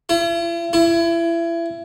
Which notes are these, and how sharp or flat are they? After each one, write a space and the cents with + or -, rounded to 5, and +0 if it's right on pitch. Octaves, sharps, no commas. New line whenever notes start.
E4 +45
E4 +30